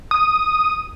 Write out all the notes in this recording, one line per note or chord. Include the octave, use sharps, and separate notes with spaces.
D#6